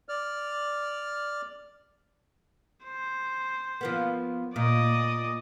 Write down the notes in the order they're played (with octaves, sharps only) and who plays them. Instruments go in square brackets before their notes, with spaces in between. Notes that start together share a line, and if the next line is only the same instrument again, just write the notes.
[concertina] D5 F6
[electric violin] C5
[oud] F3 A#3 B3
[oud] A#2 [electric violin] D5 D#5